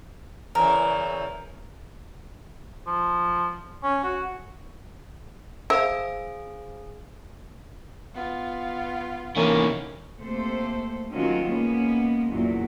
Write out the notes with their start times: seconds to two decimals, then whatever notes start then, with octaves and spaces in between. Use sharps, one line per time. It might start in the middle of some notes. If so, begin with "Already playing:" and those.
0.55 E2 C#3 E3 A#4
2.87 F3
3.83 C#4
4.04 F#4
5.70 G#4 C5 E5 F5
8.15 B3 F4
9.36 C3 E3 A#3 C#4 D#4 C#5
10.18 C3 A3 A#3 A4 C5
11.11 D#3 F#3 G#3 C4 C#4 F4
11.47 G#3 A#3 B3 C#4
12.30 E2 A#2 F#3